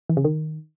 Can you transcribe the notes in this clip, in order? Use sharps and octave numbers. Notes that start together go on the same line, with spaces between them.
E3
C#3
D#3